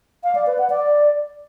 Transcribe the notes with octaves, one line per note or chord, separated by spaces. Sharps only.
F5
D5
B4
F#5
D5